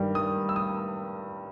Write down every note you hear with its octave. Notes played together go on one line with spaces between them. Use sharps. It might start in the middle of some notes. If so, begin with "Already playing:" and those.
Already playing: G2 D#3 G3
D#6
E6
D#6